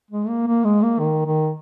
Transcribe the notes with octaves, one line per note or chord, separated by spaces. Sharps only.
G#3
A#3
A#3
G#3
A#3
D#3
D#3